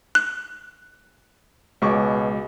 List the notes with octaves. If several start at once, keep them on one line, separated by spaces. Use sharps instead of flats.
F#6
C#2 B2 C#6 D6